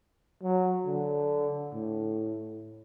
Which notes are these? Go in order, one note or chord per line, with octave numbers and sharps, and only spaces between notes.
F#3
D3
A2